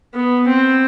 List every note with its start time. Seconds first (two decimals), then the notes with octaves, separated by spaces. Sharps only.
0.14 B3
0.47 C4